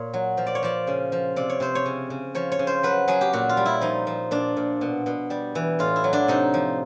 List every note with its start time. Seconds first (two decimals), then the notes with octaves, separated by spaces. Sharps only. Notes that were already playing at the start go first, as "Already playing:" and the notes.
Already playing: A#2 C#5
0.14 F#3
0.37 F3
0.47 D5
0.55 C#5
0.62 F3 D5
0.87 C#3
1.12 F3
1.36 C3 D5
1.50 C#5
1.60 C3 C5
1.75 C#5
1.86 C#3
2.10 C#3
2.35 F3 C#5
2.52 C#5
2.59 C#3
2.67 C5
2.83 F#3 B4
3.08 F#3 G#4
3.21 G4
3.33 A#2 F#4
3.49 F4
3.57 G3
3.65 E4
3.81 F3 D#4
4.07 F3
4.31 A#2 D4
4.57 A#2
4.81 B2
5.06 B2
5.30 G3
5.55 E3
5.79 A2 F4
5.96 E4
6.04 F#3
6.13 D4
6.28 C3 D#4
6.54 F3